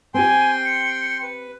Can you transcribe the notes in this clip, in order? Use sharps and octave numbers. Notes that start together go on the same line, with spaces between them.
C4 G4 G5 G#5 C6
C#7
B4